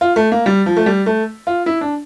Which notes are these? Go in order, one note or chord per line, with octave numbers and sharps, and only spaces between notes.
F4
A3
A#3
G3
F3
A3
G3
A3
F4
E4
D4